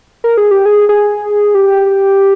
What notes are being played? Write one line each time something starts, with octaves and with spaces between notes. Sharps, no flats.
A#4
G#4
G4
G#4
G#4
G4